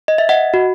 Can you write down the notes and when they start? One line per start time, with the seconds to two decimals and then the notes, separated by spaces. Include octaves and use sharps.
0.08 D#5
0.18 E5
0.29 D#5 F#5
0.54 F#4